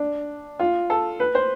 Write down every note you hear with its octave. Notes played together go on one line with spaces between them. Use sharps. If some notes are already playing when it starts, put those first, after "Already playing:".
Already playing: D4
F4
A4
B4
C5